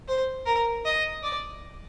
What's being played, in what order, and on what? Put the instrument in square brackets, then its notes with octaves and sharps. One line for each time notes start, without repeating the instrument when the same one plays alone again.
[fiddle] C5
A#4
D#5
D5